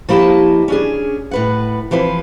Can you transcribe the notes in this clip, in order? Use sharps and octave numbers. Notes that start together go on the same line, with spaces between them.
F3 A#3 E4 G4 D#5 A5
C#4 D4 G#4
A2 B4 F#5
E3 F3 C4 B4